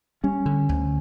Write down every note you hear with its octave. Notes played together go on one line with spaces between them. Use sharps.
G3 C#4
D3
D2